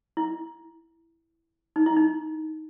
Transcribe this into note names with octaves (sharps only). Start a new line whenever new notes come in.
E4
D#4
E4
D#4